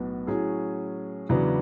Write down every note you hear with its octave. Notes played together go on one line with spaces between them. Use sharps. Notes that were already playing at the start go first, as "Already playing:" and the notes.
Already playing: B1 A2 B3 F#4
A2 F#3 C#4 G#4
E2 C#3 F#3 B3 D4